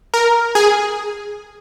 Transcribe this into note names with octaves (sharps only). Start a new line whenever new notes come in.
A#4
G#4